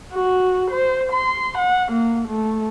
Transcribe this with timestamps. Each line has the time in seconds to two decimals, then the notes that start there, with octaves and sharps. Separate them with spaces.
0.13 F#4
0.71 C5
1.13 C6
1.58 F#5
1.92 A#3
2.28 A3